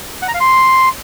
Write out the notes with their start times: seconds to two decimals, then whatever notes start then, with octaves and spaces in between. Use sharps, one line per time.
0.22 F#5
0.28 A#5
0.34 F5
0.40 C6